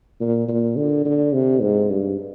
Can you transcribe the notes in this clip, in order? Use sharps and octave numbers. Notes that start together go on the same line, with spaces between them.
A#2
A#2
D3
D3
C3
G#2
G2